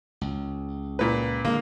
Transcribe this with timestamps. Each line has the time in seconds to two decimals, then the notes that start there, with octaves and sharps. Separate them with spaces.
0.21 C#2
0.99 A#2 B4
1.45 D3 G#3 A#3